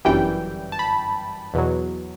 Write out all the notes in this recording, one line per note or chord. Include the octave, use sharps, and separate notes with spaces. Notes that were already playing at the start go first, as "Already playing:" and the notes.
G1 F#2 E3 G3 G5
A5
B5
E2 B2 F#3